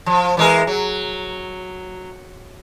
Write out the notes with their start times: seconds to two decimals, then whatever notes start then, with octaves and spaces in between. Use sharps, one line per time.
0.06 F3
0.37 E3 G#3 A#4
0.67 F#3